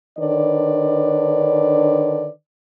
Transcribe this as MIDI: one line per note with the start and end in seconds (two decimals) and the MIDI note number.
0.18 2.29 50
0.18 2.29 51
0.18 2.29 62
0.18 2.29 71
0.18 2.29 73
0.18 2.29 74